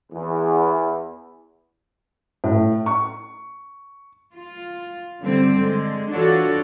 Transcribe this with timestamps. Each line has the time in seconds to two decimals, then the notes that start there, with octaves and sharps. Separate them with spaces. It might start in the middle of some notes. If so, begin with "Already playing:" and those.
0.12 E2
2.44 A2
2.86 C#6
4.33 F4
5.21 G2 D3 G3 C4
5.57 D3 G#3
6.13 E3 D4 F4 F#4 A4 C#5